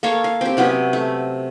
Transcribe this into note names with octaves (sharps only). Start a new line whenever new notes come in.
A#3 A4 C#5 F5
F5
C4 G4
C3 F#3 B3 C#4
A3